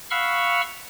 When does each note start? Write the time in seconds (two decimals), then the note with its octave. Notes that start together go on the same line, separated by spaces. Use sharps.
0.11 F5 F#5 B5 C#6 E6 F6